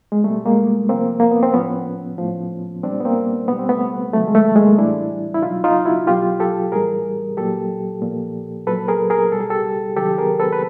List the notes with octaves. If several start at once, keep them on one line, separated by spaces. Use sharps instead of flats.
G#3
B2 G3 A3
G#3 A#3
C3 F3 A#3 C4
A#3
B3
C4
A2 F3 B3 C#4
A2 F3
A#2 G3 C4 D4
B3
A#3 C4
B2 G3 B3
C4
A3 B3
C3 D#3 F#3 A3
G#3
A3
G#3 A#3
A2 E3 G3 D4 E4
E4
B2 F#3 D#4 F4
D#4 F4
E4 F#4
B2 F#3 F4 G4
G4 A4
A2 E3 G3 G#4 A#4
A#2 F#3 G4 A4
A#2 F3
A#2 F#3 A4 B4
G#4 A#4
G#4 A#4
B2 G3 A4
G#4
G4 A4
C3 D#3 F#3 G4 A4
G#4 A#4
A4 B4
B4